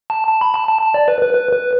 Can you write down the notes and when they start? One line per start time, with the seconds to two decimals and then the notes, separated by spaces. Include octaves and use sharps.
0.10 A5
0.28 A5
0.41 B5
0.54 A5
0.68 A5
0.82 A5
0.94 D5
1.08 B4
1.22 B4
1.35 B4
1.53 B4